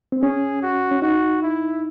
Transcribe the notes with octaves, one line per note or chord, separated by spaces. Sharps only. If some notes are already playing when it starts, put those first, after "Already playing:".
C4
C#4 G#4
F#4
C#4
D#4 F#4
E4